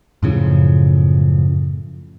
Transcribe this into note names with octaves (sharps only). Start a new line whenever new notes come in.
F#2 A2 C#3 F3